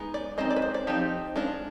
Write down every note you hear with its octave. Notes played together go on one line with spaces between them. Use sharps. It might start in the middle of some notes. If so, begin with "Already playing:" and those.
Already playing: G#3 B3 D#4
D5
G#3 C4 D#4 D#5
D5
B4
C5
D5
F3 C4 D#4 G4
G#3 D4 F4